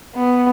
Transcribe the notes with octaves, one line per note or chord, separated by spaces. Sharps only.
B3